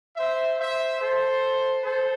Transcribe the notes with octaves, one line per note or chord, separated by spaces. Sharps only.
C5 E5
C5 E5
A4 C5
A4 C5